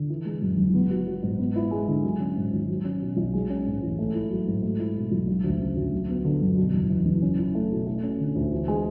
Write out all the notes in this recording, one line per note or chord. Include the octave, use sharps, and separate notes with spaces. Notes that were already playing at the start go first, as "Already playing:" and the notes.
Already playing: D3
E3
G#3
F#2
F#1
B3
F#4
F#3
G#2
B3
E4
G#3
D3
F#3
C#4
G#2
G#1
F#3
C#4
B2
B1
G#3
C#4
G#2
A1
A3
E4
F#3
G#2
A3
E4
B2
B1
F#3
D2
C#3
D2
F#3
B3
D3
F#2
B2
F#1
E2
F#1
C#4
E4
A3
B2
A3
C#4
D3
D2
E3
G#3